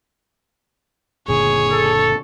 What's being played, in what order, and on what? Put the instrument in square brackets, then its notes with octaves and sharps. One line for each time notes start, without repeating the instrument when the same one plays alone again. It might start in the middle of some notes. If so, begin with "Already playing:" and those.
[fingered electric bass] F#1 A#2 D3 [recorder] G#4 [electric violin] C#5
[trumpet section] A4